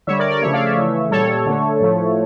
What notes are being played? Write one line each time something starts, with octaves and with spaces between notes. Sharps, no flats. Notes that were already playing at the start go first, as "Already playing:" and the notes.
D3 G3 C#5 E5
A#4 D5
A#4 D5
C#3 F3 A3 C#5 E5
D5 F5
C#5 E5
C#3 E3 A3
A#2 G3 A4 C#5
D3 A3
A2 F3 A3